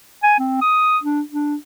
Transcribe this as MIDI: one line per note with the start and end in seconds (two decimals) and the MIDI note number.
0.23 0.37 80
0.39 0.56 60
0.61 0.98 87
1.03 1.21 62
1.32 1.55 62